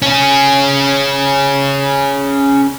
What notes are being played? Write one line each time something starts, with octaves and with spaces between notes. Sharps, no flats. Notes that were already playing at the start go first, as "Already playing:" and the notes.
C#4 G#4